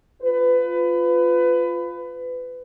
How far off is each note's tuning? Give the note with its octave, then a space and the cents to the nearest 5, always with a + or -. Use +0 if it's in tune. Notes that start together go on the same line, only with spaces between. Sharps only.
F4 +0 B4 +25